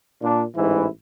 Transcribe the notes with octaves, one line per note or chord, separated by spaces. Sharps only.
A#2 D4
A1 G#2 E3 E4